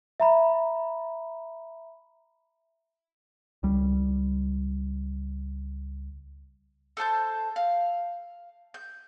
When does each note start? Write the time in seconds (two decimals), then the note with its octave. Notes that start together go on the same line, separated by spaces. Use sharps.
0.20 E5 A#5 B5
3.63 C#2 G3
6.97 A4 C5 A5 G6
7.56 F5
8.74 G6